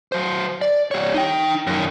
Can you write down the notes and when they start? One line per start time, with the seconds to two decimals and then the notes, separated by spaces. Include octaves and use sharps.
0.12 F#3 C5
0.61 D5
0.91 G3 C#5
1.14 D#4 G5
1.67 F#2 D#3